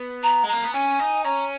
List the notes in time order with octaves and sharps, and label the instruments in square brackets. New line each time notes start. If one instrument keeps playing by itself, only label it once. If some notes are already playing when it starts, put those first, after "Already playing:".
Already playing: [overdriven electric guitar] B3
[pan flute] A#5
[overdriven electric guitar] G#3
[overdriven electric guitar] A#3 [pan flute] A#5
[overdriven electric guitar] B3
[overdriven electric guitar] C#4 [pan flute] G#5
[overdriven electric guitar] D#4
[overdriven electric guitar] C#4 [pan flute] A#5